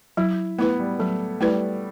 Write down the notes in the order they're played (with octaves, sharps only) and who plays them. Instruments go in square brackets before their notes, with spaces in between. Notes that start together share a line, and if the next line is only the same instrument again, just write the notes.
[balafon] F#3 [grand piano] E4
[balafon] A3 E4 B4 [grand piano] B3
[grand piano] G3
[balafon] F#3 [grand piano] A3
[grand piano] G3 [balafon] A3 E4 B4